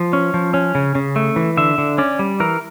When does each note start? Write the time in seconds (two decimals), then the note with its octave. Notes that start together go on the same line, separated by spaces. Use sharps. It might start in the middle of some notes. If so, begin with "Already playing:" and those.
Already playing: F3
0.13 C#4
0.34 F3
0.54 C#4
0.75 C#3
0.95 C#3
1.16 A3
1.36 E3
1.57 D3 E5
1.78 D3
1.98 C#4 D5
2.19 G3
2.40 E3 A#4